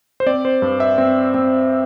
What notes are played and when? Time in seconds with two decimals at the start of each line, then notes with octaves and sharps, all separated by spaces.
0.20 C5
0.26 C4 D5
0.45 C5
0.62 G2
0.80 E5
0.98 C4
1.34 C4